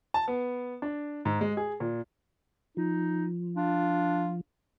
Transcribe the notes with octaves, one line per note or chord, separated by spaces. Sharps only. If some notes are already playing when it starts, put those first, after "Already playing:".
A5
B3
D4
G#2
G#3
G#4
A#2
F3 D#4
D4 F4